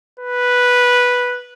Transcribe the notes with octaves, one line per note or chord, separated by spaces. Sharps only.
B4